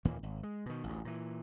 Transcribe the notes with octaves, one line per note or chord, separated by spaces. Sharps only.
D#2 A#2 E3 A#3
G#1
G#3
B2 D#3
A1 D2
A#2 E3